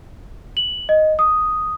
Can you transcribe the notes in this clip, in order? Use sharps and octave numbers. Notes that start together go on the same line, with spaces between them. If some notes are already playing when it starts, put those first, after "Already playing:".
F#7
D#5
D#6